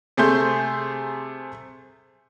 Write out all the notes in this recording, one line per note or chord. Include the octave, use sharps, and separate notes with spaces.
C3 A3 G#4 E5 C6 G6